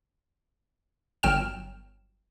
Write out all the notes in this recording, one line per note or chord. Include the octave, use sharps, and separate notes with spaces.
G1 F#3 G5 F6 E7